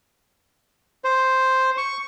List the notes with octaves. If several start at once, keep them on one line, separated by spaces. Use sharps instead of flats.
C5
C#6